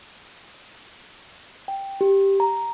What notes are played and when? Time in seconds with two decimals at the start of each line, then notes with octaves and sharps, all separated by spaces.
1.68 G5
2.01 G4
2.40 A#5